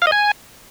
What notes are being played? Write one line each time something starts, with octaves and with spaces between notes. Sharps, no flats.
F5
D#5
G#5